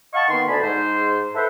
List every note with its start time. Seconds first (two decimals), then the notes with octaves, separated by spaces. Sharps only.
0.14 D#5 F5 F#5 A5 C#6
0.29 D#3 B3 C6
0.48 D2 D4 G#5 A5 B5
0.62 G#2 C5
1.35 E4 A4 B4 C5 E5 F#5